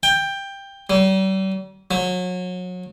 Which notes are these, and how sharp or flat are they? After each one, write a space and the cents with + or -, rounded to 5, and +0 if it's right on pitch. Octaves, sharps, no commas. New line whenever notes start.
G5 +15
G3 -40
F#3 -30